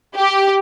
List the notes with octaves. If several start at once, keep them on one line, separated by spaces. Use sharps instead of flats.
G4